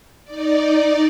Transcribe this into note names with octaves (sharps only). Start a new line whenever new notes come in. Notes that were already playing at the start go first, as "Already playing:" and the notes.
D#4 D5